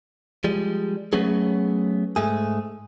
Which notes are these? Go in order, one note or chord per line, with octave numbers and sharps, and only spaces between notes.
F3 G3 G#3
F#3 A3 B3 C#4 G#4
G#2 A3 G#4